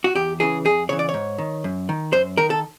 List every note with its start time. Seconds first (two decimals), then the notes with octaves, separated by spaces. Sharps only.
0.04 F#4
0.15 E2 G4
0.40 C#3 E3 G#4
0.65 F2 G#4
0.89 C#3 E3 C#5
0.99 D5
1.09 C#5
1.14 G#2
1.38 D#3
1.64 F#2
1.89 D#3
2.13 F#2 C5
2.37 D#3 A#4
2.50 A4